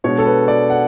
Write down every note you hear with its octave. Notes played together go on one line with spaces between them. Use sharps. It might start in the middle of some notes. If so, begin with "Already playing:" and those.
B2 G#3 D4 C#5
A4
B4
D5
F#5